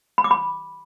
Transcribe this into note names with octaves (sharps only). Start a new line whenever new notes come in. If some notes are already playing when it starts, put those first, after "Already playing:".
B5
D6
B5